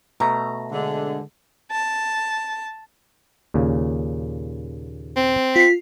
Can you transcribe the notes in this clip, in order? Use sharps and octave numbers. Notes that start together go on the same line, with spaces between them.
B2 A3 A#5
D3 G#3
A5
D#2 A#2 C#3
C4
F4 B6 C7